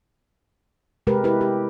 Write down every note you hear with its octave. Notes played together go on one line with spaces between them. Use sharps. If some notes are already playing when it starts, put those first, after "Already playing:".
C3 G#3 G4 A#4 B4
E4 G4 B4
G4